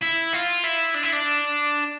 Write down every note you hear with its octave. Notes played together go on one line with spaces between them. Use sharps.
E4
F4
E4
D4
E4
D4